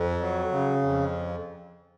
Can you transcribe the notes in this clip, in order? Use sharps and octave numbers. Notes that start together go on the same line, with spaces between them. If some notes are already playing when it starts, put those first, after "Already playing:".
Already playing: F2
F#3
C#3
F2